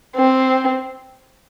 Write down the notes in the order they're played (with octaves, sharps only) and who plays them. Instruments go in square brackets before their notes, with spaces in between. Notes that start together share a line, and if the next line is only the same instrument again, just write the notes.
[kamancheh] C4